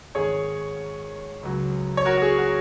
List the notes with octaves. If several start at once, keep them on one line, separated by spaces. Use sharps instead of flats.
G#1 G#2 D#3 G#4 C#5
C#2 C#3 F#3
C#5
F#4 A#4
F#4
G#4
F#4